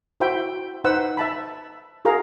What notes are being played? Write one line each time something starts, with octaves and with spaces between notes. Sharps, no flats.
E4 F#4 C5 E5 G5 B5
D#4 B4 C5 F#5 E6
E5 A5 B5
F#4 G#4 A#4 F5 A#5